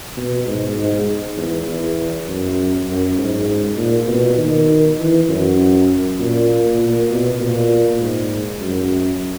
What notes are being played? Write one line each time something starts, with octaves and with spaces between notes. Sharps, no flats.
B2
G#2
G#2
E2
E2
F#2
F#2
G#2
A#2
B2
D#3
E3
F#2
A#2
A#2
B2
A#2
G#2
F#2